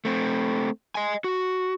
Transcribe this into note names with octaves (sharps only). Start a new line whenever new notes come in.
A3 C4
D#5 G#5
F#4